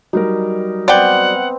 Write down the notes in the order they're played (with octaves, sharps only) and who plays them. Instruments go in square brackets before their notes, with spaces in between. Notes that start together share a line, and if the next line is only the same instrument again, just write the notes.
[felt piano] F#3 G3 A#4 [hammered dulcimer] D#4
[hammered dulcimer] B3 C4 [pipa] D5 G5 [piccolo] F#5